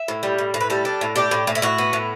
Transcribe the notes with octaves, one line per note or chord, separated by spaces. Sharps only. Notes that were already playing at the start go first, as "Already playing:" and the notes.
Already playing: E5
A2
G3
A2
A2
B4
G3 A4
D4
A2
D4 G4
A2
A2
E4
A2 F#4
B3
A2